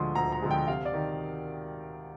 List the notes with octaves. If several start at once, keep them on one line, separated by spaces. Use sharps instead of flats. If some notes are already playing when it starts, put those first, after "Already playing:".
Already playing: D2 D3 F3 G#3 C6 D#6
D2 A#5
A#5
D3 F3 G#3
G5
C3 F5
D5
D#3